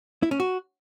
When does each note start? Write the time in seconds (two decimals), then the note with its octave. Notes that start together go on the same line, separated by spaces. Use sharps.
0.23 E4
0.31 C#4
0.40 F#4